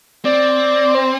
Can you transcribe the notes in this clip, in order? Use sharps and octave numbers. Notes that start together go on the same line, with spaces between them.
C4 D5
C5